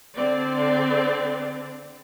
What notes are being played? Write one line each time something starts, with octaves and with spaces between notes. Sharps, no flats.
D3 C4 D5